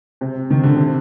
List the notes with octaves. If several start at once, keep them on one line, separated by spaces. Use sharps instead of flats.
C3
D#3
D3
C3